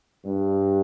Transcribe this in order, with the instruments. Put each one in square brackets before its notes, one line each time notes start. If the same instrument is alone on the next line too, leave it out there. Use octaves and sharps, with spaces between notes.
[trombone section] G2